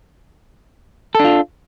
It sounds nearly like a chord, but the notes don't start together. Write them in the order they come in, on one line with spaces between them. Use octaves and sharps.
A4 D4 F4